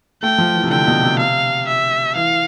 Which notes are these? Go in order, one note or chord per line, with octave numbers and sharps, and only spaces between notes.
A3 G5
F3
E3
C3
D3 G5
B2
C3
F5
E5
E3 F5